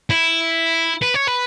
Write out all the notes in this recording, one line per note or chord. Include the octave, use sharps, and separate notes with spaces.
E4
B4
C#5
B4